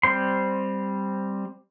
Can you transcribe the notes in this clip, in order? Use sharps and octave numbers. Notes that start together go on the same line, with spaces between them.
G3 C4 C5 C6